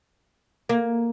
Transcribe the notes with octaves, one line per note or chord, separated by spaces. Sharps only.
A#3